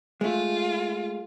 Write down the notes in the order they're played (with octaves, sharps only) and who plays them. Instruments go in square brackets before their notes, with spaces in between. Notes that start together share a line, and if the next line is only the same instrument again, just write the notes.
[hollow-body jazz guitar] G#3 A3 [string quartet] F4